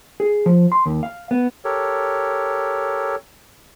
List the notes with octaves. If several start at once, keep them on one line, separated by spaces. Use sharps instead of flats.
G#4
F3
C6
D#2
F5
B3
G4 A4 A#4 C#5